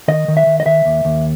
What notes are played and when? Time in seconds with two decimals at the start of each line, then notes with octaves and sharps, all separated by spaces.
0.08 D#3 D#5
0.28 D#3
0.37 E5
0.46 D#3
0.60 D#5
0.66 D#3 E5
0.85 D#2
1.05 D#2